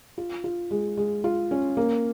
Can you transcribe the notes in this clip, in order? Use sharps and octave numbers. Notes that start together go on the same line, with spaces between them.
F4
F4
G#3
G#3
F4
C#4
A#3